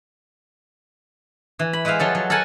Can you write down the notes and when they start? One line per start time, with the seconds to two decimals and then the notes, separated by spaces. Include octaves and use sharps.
1.59 E3
1.73 B5
1.85 G#3 B4 C5 E5 F5
1.99 F3 F#3 A4
2.15 F#3
2.30 A4 A#4 F#5 G#5 A5